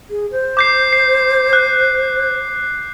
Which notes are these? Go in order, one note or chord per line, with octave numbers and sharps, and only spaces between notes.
G#4
C5
D6 G6 C7
C7
F#6